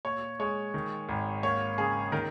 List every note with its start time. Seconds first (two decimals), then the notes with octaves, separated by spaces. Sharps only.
0.05 A#2 C#5
0.39 G#3 C#5
0.74 D#3
1.09 G#1
1.43 A#3 C#5
1.78 C#3 G#4
2.12 D#3 A#4